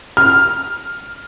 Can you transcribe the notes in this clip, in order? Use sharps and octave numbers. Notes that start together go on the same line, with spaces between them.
F6